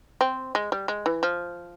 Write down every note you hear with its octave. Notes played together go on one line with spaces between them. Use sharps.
C4
G#3
G3
G#3
E3
F3